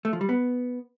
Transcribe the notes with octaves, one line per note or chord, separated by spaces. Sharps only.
A3
F3
G3
B3